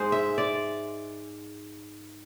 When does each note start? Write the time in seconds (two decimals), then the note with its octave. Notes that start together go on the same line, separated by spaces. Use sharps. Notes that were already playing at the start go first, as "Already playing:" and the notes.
Already playing: G#2 G#3 C5
0.12 E5
0.38 D5